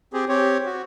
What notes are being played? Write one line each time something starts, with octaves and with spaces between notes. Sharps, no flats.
C4 G4 G#4
C4 G4 C#5
F#4